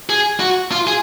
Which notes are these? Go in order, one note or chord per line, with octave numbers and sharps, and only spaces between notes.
G#4
F#4
F4
G#4